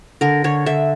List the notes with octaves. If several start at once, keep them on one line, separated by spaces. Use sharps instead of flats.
D3 A#4
D3 C#5
D3 E5